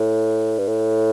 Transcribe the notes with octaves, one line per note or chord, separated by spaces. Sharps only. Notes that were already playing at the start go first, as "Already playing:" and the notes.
Already playing: A2
G2
A2